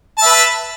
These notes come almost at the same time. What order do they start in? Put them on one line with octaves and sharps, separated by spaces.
A5 E5 B4